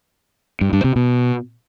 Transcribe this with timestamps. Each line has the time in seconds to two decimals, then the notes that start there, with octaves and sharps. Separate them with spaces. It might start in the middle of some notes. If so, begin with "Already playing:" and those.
0.61 G2
0.73 G2
0.84 C3
0.96 B2